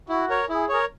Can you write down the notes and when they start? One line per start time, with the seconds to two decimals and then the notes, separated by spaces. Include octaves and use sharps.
0.09 E4 F#4
0.29 A#4 C#5
0.49 E4 G#4
0.69 A#4 C#5